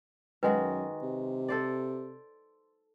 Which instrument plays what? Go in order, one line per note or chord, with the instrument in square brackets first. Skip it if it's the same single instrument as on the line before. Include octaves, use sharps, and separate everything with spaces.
[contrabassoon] F#2 [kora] D#3 G#3 F#4 [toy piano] B4
[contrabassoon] C3
[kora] A4 C5 D5